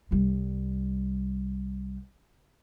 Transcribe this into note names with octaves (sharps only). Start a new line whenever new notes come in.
C2 G3